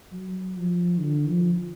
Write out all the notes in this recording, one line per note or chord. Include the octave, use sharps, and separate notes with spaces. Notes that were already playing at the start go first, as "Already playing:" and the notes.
F#3
F3
D3
F3